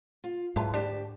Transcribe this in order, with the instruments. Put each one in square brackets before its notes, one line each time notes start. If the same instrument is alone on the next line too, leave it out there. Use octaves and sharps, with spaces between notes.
[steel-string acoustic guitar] F4
[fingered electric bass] G#2 [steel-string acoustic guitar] F#3 B4 [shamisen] E4 F4 A5
[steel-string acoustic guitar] D2 G4 A5 [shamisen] D4